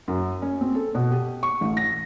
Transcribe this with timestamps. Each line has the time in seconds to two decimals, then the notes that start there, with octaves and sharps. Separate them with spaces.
0.08 F#2
0.42 C#4
0.61 C4
0.75 A4
0.95 B2
1.11 G4
1.43 C#6
1.61 A1
1.77 A#6